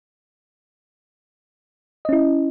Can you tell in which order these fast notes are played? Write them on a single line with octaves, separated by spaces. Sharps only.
D#5 C#4 E4